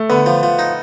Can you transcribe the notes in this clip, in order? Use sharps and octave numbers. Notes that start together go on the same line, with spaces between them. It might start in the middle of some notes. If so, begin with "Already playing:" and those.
Already playing: A3
D3 B3
F3
F3
D#4